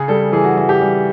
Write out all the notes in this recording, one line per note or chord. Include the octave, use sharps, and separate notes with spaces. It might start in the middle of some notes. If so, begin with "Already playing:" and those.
Already playing: C#3 G#4
G3 A4
E3 G#4
F#4
E3 F#4
G4
G3